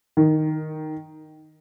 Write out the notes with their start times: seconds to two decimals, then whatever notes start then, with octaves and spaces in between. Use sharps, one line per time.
0.17 D#3